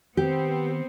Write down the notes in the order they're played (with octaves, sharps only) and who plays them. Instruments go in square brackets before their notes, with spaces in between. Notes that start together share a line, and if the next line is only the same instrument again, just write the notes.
[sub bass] D#3 [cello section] B3 C4 [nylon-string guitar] G4